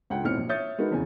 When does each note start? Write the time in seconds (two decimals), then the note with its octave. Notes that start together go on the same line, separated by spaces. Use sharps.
0.10 C#2 F#5 G5
0.24 B1 A2 C4 F6 C#7
0.37 A#1
0.49 C#5 E5 D#6 G6 A6 C#7
0.78 G#3 D#4 F#4 A#4 B4
0.91 F1 E2 C#3 G#5